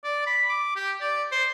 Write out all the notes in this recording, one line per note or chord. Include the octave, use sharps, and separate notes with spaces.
D5
B5
D6
G4
D5
C5